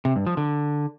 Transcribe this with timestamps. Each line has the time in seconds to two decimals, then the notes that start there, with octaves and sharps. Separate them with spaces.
0.05 C3
0.16 G2
0.27 F3
0.37 D3